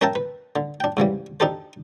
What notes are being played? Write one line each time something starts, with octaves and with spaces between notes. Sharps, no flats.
C#4 A#4 E5 G5 A5
B4
D3
D4 G5
G#2 C#3 E3 G3
D4 D#4 G4 A4 C5